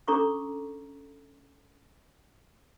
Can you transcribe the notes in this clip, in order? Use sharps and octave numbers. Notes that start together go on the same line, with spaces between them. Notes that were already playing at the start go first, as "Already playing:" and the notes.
C#4 D4 A4 A#5 C#6 D6